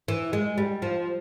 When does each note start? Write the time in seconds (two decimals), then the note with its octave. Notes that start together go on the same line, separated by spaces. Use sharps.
0.08 E3
0.33 G#3
0.58 G3
0.82 F3